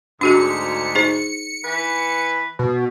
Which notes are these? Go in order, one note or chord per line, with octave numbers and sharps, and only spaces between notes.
D2 G#2 D4 F#4 G#4 C#7
D#4 G#4 C5
E3 B4
B2